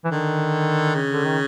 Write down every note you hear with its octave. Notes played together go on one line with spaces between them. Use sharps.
E3
D3 D#3
C#3
D3
D#3